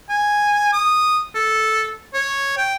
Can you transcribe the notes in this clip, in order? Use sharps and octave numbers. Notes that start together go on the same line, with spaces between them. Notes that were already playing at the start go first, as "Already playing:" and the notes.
G#5
D#6
A4
C#5
G5